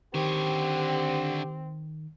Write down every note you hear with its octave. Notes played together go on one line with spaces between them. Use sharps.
D3 D#3 C4 G4 C#5